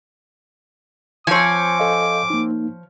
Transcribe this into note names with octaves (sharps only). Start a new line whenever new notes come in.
F3 C4 C#5 G#5 D6
A4 D#5 F5
A#3 D#4